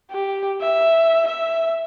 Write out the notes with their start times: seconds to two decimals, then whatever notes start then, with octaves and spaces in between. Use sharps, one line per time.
0.10 G4
0.61 E5
1.27 E5